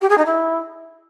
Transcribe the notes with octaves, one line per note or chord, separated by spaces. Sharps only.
G4
G#4
D#4
E4